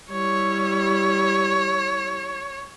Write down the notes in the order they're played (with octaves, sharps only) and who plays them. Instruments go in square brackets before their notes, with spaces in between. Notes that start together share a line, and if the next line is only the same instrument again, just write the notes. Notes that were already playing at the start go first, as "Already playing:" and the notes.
[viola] G3 E4 [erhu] C#5